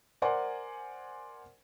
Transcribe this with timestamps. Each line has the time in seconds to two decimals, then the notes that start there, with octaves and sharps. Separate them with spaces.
0.22 A#4 C5 D5 F#5 G#5 C6